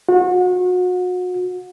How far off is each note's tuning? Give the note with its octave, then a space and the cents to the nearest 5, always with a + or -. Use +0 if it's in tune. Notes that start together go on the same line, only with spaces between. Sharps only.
F#4 -35